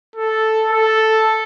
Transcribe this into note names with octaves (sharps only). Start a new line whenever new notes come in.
A4
A4